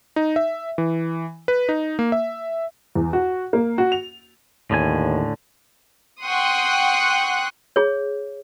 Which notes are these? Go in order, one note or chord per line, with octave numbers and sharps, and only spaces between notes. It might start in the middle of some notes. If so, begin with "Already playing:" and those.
D#4
E5
E3
B4
D#4
A#3
E5
E2
F#4
A#3
F#4
F7
D#2 A2 D3 G#5
F#5 G5 C6 C#6 D#6 F#6
G#4 C#5